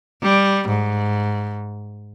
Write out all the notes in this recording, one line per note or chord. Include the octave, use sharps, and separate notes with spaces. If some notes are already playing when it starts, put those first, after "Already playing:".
G3
G#2